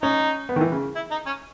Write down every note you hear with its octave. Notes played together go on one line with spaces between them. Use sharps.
C#4 D#4
B3
D#3
E3
C#3
E4
D#4
C#4